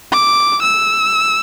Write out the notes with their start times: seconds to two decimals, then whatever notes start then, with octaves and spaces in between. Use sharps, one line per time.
0.12 D6
0.63 E6